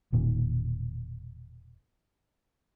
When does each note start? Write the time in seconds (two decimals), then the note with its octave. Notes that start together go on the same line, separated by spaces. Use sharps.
0.13 E1 A#2 D#3